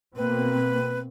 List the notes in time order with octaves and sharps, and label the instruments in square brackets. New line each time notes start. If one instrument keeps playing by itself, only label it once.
[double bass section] B2 A#3 C4 [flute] B4